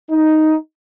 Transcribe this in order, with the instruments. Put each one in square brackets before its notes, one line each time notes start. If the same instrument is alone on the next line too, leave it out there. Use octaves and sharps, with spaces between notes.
[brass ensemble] D#4